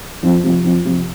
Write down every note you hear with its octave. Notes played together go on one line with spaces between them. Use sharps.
F2
C3 F3
F2
C3 F3